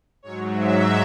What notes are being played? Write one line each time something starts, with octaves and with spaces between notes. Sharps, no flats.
G#2 F#3 C#5
E5